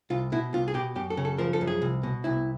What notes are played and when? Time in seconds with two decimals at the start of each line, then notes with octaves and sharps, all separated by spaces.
0.10 C2 F4
0.32 B2 E4
0.53 C2 F4
0.68 G#4
0.74 B2 G4
0.95 F#2 G4
1.10 A4
1.17 C#3
1.25 A4
1.38 F3 A#4
1.53 A4
1.61 F#2
1.67 G#4
1.82 C2
2.03 B2
2.24 C2 E4